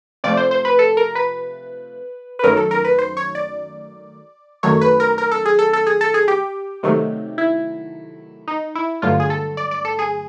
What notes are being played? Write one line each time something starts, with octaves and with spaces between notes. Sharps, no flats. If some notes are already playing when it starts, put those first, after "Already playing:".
C3 F3 A3 D5
C5
C5
B4
A4
A#4
B4
B4
F#2 D#3 F#3 A3 A#4
A4
A#4
B4
C5
C#5
D5
F#2 D#3 F#3 A3 C#5
B4
A#4
A#4
A4
G#4
A4
A4
G#4
A4
G#4
G4
C3 D#3 F#3 A3
E4
D#4
E4
G2 D3 F#3 A3 F4
G#4
A4
D5
D5
A4
G#4